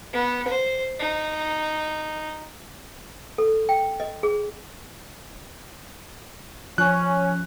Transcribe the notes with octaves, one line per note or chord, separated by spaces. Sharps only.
B3
C5
D#4
A4
G5
D#5
G#4
F3 C#4 F#6